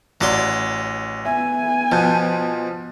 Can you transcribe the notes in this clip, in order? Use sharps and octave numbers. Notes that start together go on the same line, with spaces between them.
A1 F#3 D5 C6
B3 E5 G#5
B2 F3 A5 G6